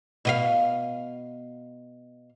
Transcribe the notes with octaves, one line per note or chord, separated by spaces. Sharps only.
B2 D#5 F5